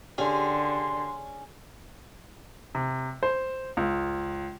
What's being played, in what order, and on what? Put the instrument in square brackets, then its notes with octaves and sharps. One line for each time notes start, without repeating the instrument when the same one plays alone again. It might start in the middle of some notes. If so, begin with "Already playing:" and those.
[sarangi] D3 [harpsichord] C#4 G#4 [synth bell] G4 G5 [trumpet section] C6
[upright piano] C3
C5
C#2